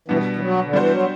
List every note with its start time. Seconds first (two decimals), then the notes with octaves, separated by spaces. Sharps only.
0.08 B2 E3 G3 B3 D4
0.36 E3
0.41 F#3
0.64 D3
0.73 E3 G3 B3 D4 F#4 C5
0.92 F#3